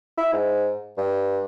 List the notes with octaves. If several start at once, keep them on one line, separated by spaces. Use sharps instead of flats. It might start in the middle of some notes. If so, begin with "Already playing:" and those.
E4
G#2
G2